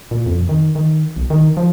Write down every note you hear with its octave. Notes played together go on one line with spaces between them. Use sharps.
A#2
F2
D#3
D#3
B1
D#3
F3